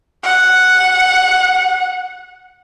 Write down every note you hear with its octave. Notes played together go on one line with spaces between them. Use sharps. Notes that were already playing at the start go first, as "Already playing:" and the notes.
F#5